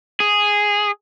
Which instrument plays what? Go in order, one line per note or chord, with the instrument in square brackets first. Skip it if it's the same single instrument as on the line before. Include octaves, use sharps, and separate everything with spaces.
[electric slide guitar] G#4